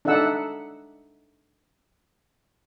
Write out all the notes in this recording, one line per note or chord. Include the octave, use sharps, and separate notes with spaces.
D4 D#4 A4 E5 F#5 E6